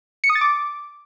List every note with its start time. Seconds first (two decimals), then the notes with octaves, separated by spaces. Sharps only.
0.24 C#7
0.30 D#6
0.35 A6
0.41 D6